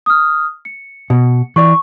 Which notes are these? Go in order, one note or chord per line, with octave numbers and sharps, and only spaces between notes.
D#6 F6
C#7
B2
E3 D5 C#6